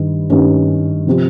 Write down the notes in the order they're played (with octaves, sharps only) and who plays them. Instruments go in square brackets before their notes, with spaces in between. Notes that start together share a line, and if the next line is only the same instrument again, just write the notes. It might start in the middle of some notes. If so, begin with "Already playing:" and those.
Already playing: [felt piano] G2 D#3 G3
G2 D#3 G3 C#4
C3 F3 C4 G4